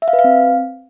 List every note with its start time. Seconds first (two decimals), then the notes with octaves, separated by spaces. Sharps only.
0.02 E5
0.08 F5
0.13 B4
0.19 F5
0.24 C4